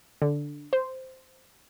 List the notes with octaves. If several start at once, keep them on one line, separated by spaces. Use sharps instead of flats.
D3
C5